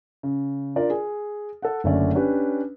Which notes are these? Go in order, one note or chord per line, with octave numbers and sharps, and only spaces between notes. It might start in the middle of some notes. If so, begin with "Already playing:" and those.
C#3
D4 F4 A#4 D5
G#4
A4 F#5
F#1 D3 A3 C#4 D5
C#4 D4 G4 B4